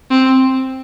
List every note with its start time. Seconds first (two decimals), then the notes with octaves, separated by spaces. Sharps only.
0.10 C4